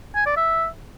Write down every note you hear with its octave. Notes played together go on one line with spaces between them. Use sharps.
G#5
D5
E5